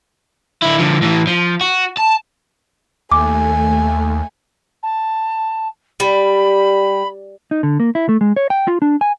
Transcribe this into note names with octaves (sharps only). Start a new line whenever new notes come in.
D3 E4
D3 F3
A2 E3
F3
F#4
A5
D#2 A3 G#5 D6
A5
G3 B5
D#4
D3
A#3
E4
A3
G#3
C#5
G5
F4
D4
G#5